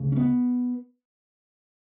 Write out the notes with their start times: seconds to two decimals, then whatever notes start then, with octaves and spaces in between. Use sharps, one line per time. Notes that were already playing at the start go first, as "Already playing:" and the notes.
Already playing: D2 C#3
0.12 C#4
0.16 B3